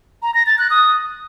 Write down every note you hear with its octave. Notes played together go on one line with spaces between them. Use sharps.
A#5
A#6
A6
F#6
D#6